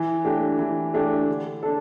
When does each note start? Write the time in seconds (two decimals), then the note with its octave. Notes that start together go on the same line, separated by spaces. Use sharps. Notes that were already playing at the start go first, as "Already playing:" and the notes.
Already playing: E3
0.24 A3 D4 G4
0.59 E3
0.94 A3 D4 G4
1.28 D3
1.63 D4 A4